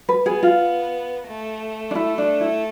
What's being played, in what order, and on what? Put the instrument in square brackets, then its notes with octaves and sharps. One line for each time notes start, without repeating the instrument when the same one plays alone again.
[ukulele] B4
[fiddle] B3 [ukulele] G#4
[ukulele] F4
[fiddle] A3
[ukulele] D4
E4
D4
E4